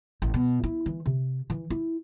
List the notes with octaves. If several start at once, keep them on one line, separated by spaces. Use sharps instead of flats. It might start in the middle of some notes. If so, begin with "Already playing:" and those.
A1
B2
E4
E3
C3
E3
E4